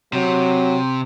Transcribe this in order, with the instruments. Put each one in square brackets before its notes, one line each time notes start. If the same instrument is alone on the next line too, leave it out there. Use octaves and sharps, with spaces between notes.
[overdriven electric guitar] C3 [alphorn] F#3